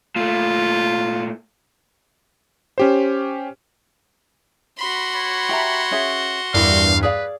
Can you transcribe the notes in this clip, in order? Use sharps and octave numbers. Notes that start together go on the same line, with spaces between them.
A#2 A3 F4
C#4 G4 C5
F#4 B5 C6
C#5
G4 E5 A#5
C#4 G#4 E5
E2 G2 E4 A#4 D5 F5
G#4 B4 D5 F5